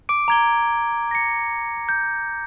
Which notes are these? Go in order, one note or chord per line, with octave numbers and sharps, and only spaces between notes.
D6 D7
A#5 G#6 G7
A#6 C#7
G6